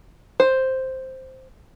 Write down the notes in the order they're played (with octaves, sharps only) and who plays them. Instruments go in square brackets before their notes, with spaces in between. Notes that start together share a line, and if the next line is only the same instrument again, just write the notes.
[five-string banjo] C5